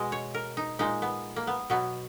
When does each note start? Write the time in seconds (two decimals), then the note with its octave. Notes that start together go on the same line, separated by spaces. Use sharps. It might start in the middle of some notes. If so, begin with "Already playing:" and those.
Already playing: B2 G#3 D#5
0.12 C#5
0.34 A#4
0.57 D#4
0.79 A#2 G#3 D#4
1.02 B3
1.36 A#3
1.47 B3
1.70 B2 F#3 B3